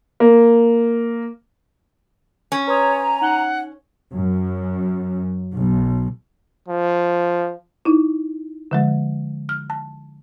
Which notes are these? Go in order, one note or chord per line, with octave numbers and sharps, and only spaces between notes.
A#3
C#4
B4 C#5 G#5 A#5 C6 D#6
D#4 F#5 F#7 G7
F#2
B1
F3
D#4 E4
D3 F3 G#3
F6
A5